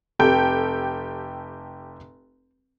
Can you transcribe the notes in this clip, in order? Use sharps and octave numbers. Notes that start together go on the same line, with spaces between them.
F1 G4 A4 G5